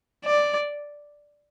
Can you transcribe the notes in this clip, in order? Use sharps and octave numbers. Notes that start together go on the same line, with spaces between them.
D5